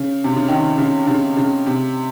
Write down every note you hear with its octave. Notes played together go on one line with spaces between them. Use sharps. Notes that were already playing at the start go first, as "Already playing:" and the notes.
Already playing: C#3
C3
C#3
D#3
C#3
C#3
C#3
C3